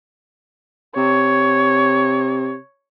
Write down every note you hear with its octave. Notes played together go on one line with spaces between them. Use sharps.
C3 C#5